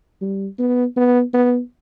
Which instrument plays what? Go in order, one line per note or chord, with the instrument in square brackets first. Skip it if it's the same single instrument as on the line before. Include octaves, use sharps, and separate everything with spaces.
[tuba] G3
B3
B3
B3